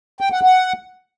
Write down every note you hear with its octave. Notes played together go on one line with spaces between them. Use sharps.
G5
F#5
F#5